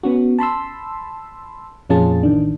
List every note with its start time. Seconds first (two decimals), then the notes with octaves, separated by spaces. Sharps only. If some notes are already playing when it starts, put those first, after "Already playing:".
0.03 B3 C#4 F#4
0.39 A5 B5 C6 E6
1.89 F2 A#2 C#4 F4 G#4 A5
2.23 A1 D#3 D4